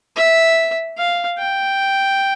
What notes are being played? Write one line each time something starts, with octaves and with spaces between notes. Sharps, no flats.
E5
F5
G5